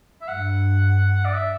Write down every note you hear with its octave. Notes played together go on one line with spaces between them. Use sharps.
E5
G2 F#5
D5
E5